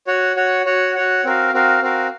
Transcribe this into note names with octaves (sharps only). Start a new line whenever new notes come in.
F#4 C#5 F#5
F#4 C#5 F#5
F#4 C#5 F#5
F#4 C#5 F#5
C4 F#4 A#4 F5
C4 F#4 A#4 F5
C4 F#4 A#4 F5